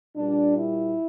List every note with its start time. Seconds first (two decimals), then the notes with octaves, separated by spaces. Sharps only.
0.16 A#2 G3 D4
0.56 E4